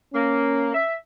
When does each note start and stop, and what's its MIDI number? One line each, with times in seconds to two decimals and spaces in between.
0.14 0.71 58
0.14 0.82 61
0.73 0.95 76